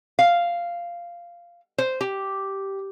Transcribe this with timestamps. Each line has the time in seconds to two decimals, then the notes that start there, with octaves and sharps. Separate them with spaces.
0.19 F5
1.78 C5
2.01 G4